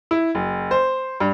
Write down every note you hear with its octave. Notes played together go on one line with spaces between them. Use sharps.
E4
F#1
C5
G2